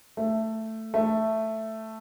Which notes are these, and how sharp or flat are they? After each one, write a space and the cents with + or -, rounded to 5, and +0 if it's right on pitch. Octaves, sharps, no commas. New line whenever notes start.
A3 +10
A3 +5